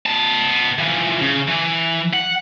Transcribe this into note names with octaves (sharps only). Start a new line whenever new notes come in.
B3 A5
E3 F3
C#3
E3
F#5